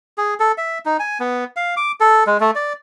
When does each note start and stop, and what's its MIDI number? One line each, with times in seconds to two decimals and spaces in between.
0.18 0.34 68
0.40 0.52 69
0.58 0.79 76
0.85 0.97 63
1.00 1.18 80
1.20 1.44 59
1.56 1.75 77
1.77 1.92 86
2.00 2.24 69
2.27 2.37 56
2.40 2.51 57
2.55 2.73 74